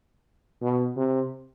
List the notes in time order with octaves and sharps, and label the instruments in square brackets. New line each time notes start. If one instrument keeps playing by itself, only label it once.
[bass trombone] B2
C3